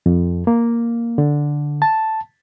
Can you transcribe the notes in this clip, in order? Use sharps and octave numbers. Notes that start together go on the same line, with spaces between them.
F2
A#3
D3
A5